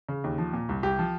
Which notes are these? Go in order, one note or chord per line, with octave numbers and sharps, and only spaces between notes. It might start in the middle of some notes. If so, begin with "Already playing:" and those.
C#3
D#2
F3
A#2
C2
C2 G4
F3